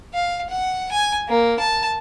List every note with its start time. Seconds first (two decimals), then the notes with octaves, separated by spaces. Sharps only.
0.14 F5
0.50 F#5
0.92 G#5
1.29 A#3
1.59 A5